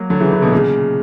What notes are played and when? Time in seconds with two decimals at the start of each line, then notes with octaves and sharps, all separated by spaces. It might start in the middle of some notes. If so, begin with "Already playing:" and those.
Already playing: F#3 A#3
0.10 D3 F#3
0.20 C#3 E3
0.32 C#3 E3
0.42 B2 D3
0.52 A#2 C#3